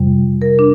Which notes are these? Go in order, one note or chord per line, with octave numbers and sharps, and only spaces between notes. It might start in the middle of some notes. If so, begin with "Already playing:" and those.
Already playing: F2 C3 G3
A#4
D4